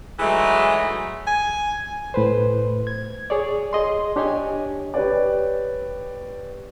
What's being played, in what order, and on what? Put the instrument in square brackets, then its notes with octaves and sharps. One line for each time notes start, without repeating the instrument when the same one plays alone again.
[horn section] E3 F#3 G#3 A3 D#4
[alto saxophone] G#5
[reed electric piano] A2 B4 C5
G#6
G#4 C#5 D5
G#4 D#5 C6
D4 G4 C#5 D#5 G#5
[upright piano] G4 B4 C#5 D5